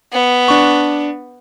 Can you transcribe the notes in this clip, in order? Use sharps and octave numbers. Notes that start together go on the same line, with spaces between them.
B3
D4 C#6